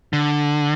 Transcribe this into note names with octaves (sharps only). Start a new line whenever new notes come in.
D3